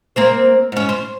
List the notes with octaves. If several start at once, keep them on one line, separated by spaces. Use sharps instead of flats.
A#3 C4 C5
G#2 C#4
C5